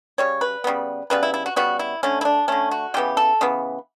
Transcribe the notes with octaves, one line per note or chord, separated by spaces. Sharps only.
C#3 G3 C#5
B4
C#3 G3 B3
C#3 G3 B3 B4
E4
E4
F#4
C#3 G3 B3 F#4
E4
D3 A3 C#4
E4
D4
D3 A3 C#4
F#4
C#3 E3 B3 G4
A4
C#3 E3 B3